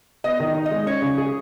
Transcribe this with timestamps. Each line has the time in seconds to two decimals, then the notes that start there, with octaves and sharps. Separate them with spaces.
0.24 B3 D#5
0.40 D#3
0.55 D#4
0.66 D#5
0.71 G#3
0.86 C#4 C#5
1.02 C#3
1.18 G#4